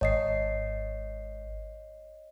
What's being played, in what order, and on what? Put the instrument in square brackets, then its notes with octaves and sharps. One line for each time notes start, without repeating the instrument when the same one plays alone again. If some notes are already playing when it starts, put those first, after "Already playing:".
[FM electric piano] G#1 [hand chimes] C#5 D#5 C7